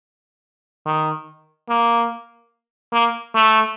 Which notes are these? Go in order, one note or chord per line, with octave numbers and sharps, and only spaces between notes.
D#3
A#3
A#3
A3